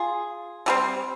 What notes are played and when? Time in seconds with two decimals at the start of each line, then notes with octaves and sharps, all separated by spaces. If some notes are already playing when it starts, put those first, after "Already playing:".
Already playing: F4 G#4
0.66 D3 G3 C4